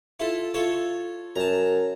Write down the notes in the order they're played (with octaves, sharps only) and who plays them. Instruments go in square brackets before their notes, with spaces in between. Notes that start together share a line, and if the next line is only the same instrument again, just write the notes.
[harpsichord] E4 F4 A4
F4 A4 C#5
[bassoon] F#2 [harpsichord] A5 A#5